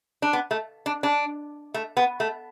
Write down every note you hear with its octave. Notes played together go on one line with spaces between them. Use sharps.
D4
B3
A3
D4
D4
A3
B3
A3